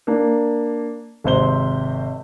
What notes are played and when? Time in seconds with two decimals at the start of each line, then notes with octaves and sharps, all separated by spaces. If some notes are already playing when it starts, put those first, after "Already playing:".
0.07 A#3 D4
1.24 G#1 C3 C5 G7